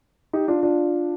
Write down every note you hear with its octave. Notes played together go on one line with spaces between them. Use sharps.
D#4 G4
D4 F4
D4 F4